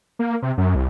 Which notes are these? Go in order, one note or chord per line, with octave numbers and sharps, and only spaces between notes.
A#3
C3
F#2
C2